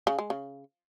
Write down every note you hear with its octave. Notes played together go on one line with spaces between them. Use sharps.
C#3
G#3
C#3